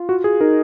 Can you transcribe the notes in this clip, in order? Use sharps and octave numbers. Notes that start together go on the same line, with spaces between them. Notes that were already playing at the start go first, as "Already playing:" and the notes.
Already playing: F4
F#4
G#4
D#4 A#4